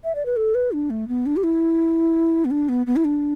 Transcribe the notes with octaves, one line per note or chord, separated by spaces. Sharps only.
E5
D5
B4
A4
B4
D4
A3
B3
D4
G4
E4
B3
D4
B3
B3
E4
D4